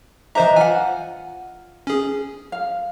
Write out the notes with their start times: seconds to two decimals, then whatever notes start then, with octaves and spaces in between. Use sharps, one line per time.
0.35 E3 D4 C5 D#5 E5 A#5
0.56 F4 F#5 G#5
1.87 C#4 G#4
2.52 F5